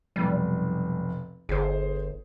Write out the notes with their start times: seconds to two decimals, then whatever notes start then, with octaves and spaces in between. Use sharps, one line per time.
0.16 F1 B1 G3
1.49 G1 G#4 C5